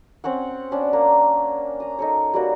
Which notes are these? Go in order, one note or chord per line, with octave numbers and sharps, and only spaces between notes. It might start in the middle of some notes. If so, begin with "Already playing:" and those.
C4 C#4 C#5 F#5
B3 C#4 D4
A#3
A#5 D#6
D#4 A4 C#5
G3 A#3 F#4